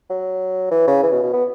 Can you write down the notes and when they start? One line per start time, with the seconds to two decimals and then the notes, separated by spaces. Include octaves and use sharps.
0.10 F#3
0.71 E3
0.87 C#3
1.03 E3
1.12 B2
1.23 B2
1.33 B3